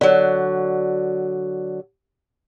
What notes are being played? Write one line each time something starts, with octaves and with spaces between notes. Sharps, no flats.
D3 F#3